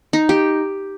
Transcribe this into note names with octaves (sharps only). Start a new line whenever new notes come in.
D#4
G4